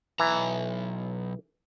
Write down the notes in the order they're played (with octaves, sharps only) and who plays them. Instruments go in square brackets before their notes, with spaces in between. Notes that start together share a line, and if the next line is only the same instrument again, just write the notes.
[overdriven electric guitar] B1 A#5 [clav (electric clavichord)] E3